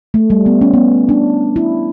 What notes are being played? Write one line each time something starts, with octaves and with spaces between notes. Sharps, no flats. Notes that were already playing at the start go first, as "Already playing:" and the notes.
A3
G3
B3
C#4
B3
D4
E4